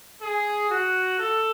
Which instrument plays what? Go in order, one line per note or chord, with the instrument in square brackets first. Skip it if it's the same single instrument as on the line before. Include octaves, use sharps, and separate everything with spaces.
[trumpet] G#4
F#4
A4